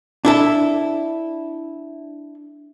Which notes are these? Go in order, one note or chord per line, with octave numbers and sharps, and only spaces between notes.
D4 E4 A4